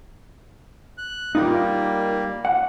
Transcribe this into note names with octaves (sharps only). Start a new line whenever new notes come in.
F#6
G3 A#3 D#4 F4 A#4
F#5